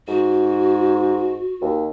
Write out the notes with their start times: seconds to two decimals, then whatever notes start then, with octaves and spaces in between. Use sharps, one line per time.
0.08 G#2 F#4
1.62 D#2